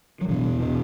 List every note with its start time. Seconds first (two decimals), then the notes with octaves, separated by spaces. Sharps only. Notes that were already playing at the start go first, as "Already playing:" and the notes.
0.21 F#3
0.28 B2 E3
0.44 E2
0.60 B2